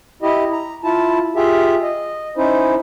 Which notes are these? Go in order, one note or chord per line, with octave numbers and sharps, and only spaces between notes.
E4 G4 D#5
A#5
E4 F4 A5
F4 G4 G#4 E5
D#5
C#4 D#4 E4 C5